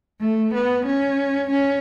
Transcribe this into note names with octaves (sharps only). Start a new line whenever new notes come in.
A3
B3
C#4
C#4